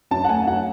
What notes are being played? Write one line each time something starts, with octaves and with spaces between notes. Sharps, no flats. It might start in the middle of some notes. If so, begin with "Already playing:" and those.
F#2 A5
F#5
A3 G#5
F#2 F#5